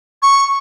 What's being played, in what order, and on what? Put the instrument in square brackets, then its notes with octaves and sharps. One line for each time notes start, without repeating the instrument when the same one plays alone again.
[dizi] C#6